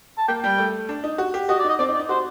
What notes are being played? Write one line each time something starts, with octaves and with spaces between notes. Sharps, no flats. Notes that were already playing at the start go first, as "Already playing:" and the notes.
A5
A#3 G5
G3 G5
A3
D4
D#4
F#4
G4
F#4 D#5
D5
D#4 D#5
C4 D5
D#4
D5
D#4
F#4 C5